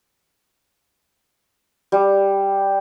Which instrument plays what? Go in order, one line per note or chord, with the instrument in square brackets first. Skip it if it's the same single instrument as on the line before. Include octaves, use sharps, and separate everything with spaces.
[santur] G3